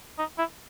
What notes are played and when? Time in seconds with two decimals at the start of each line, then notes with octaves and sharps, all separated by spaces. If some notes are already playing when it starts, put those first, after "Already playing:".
0.18 D#4
0.38 E4